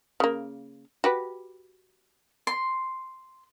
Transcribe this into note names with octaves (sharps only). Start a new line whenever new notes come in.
C#3 A#3
F#4 G4 B4
C6